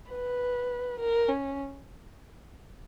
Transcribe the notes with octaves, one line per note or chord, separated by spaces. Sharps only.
B4
A#4
C#4